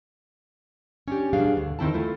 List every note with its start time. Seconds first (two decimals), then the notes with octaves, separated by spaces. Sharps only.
1.08 C#4 D4 G4
1.33 B2 G3 D4 G#4 F5
1.53 D2 B2
1.79 E2 D#3 C4 E4 A5
1.94 A3 E4 F4